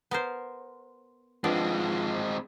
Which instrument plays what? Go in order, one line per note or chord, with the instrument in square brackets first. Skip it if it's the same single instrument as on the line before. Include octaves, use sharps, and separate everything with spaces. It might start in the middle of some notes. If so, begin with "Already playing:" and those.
[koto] B3 A#4 C5
[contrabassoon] F3 [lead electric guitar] G#3 C4 [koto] B3 D4 D5